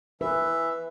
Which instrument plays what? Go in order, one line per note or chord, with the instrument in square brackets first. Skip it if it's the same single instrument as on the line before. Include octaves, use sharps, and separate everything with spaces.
[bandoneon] E3 E5 [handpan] B4